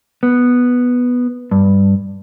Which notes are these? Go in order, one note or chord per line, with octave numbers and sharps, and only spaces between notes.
B3
G2